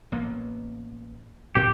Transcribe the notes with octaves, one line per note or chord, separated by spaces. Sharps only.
A1 A#3 B3
D2 A2 C4 G4